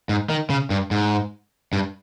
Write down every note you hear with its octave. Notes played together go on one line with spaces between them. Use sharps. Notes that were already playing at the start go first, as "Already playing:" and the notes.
G#2
D#3
C#3
G2
G#2
G2